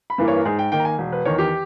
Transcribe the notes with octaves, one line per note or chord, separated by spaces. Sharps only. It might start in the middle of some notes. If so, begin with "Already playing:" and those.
B5
G2 E3 A#3 E4
C#5
A#4
G#2 G#4
G5
D#3 A#3 G5
A#5
G#5
E1
B4
E2 D#3 C#5
G4